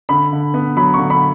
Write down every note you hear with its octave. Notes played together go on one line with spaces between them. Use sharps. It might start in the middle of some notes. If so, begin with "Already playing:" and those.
D3 B5
D3
B3
F#3 B5
C#6
D3
B5